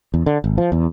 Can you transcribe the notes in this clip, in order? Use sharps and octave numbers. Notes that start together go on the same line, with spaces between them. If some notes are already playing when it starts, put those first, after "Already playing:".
E2
D3
G#1
F3
E2